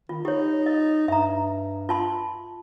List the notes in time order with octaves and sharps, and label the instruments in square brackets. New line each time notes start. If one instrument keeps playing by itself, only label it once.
[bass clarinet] D#3 [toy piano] F4
[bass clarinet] D#4 [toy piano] G4 C#5
[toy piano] D#5
[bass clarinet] G2 [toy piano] E5 A#5
[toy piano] F4 A5 C6